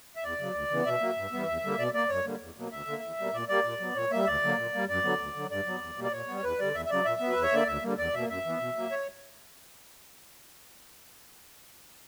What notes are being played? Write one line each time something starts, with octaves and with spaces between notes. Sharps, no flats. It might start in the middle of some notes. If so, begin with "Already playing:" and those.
E5
E2 D5
C#3 F#3
D2
C#3 E3 B3
B2 E5
F#3 A#3
G2
E3 G3 B3
E2
D3 G3 A#3
B2 D5
A#3 D5
F#2 C#5
D3 G3 A#3
E2
B2 F#3 A#3
D2 E5
D3 A#3
E2
B2 G3 A#3
A#2 D5
G3 A#3 D5
A#2
F#3 B3
A#2 C#5
G3 A#3 E5
D2 D5
D3 F#3 A#3
A#2
G3 A#3
F#2 D5
D3 F#3 B3
D2
D3 F#3
G2 D5
F#3 B3
E2
B2 G3 A#3
D5
A#2 C#5
G3 B3
E2 B4
D3 G3 D5
E2 E5
E5
C#3 F#3 D5
A#2 E5
F#3 B3
B4
E2
C#5
D3 A#3 D5
D2 E5
D3 G3 A#3
E2 D5
B2 A#3 E5
F#2 E5
E3 B3
B2
F#3 A#3
C#5